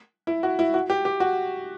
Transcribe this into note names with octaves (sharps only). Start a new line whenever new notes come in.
E4
F#4
E4
F#4
G4
G4
F#4